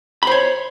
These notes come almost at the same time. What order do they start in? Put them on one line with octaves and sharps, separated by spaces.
B5 C5 C#5